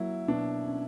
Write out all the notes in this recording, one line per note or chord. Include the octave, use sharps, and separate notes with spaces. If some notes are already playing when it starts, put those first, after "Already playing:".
Already playing: F#3 A#3 E4
B2 D4
C#4